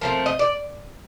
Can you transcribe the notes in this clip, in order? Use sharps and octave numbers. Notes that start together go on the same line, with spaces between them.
F3 A3 C4 A#4
D#5
D5